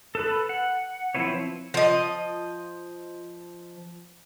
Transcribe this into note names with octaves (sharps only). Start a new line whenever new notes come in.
A4 B4 B5
F#5
F3 C4 E4 B4 C#5
F3 D#5